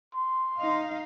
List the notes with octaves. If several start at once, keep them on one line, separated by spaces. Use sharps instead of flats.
C6
D#4 F5